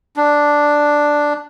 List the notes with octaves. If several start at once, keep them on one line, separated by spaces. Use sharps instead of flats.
D4